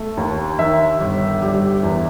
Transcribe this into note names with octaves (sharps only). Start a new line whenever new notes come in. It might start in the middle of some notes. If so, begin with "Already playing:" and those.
Already playing: A3
D#2
D#3 E5
G1
G3
E2